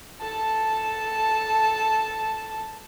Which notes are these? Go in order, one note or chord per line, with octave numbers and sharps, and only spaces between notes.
A4 A5